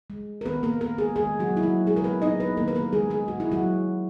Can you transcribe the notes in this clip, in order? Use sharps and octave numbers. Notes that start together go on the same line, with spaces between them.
G#3
A#4
D#3 B3 B4
A#3 A#4
A#3 A#4
G#3 G#4
D#3 G#3 G#4
F#3 F#4
A#3
E4
F#3 F#4
B2 G#3 G#4
A#4
B3 B4
F#3 A#3 D#4 D#5
B3 B4
D#3 A#3 A#4
B4
A#3 A#4
G#3 A#3 G#4
G#3 G#4
A#2 F#4
E4
F#3 F#4
G#3